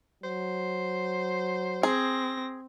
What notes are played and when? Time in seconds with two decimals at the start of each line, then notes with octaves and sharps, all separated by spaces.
0.24 F#3 C5
1.83 C4 G#4 A#6